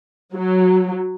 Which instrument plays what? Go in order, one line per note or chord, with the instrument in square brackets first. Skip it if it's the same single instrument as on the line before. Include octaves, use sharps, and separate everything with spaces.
[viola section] F#3